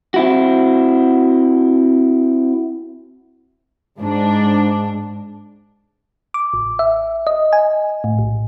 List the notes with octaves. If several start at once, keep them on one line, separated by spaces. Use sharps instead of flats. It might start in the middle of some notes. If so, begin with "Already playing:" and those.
C4 E4 F#4
G#2 D4
D6
A1
E5
D#5
G#5
A2
A#1